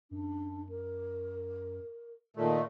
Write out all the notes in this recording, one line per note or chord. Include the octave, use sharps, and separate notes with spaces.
F#2 D4
A#4
A#2 D#3 A3